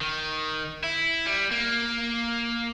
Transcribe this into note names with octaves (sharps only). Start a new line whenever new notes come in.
D#3
E4
G3
A#3